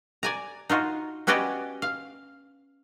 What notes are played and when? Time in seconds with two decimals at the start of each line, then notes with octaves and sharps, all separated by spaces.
0.23 D5 G#5 A#5
0.69 D#4 F4 F#4
1.27 B3 C#4 F#4 G4 D5 D#5
1.82 F5